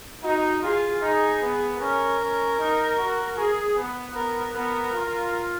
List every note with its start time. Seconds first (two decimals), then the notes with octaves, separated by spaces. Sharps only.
0.23 D#4 F#4
0.62 F4 G#4
1.01 D#4 G#4
1.41 B3
1.80 C#4 A#4
2.19 C#4
2.58 D#4
2.97 F#4
3.37 G#4
3.76 B3
4.15 B3 A#4
4.53 B3 A#4
4.93 F4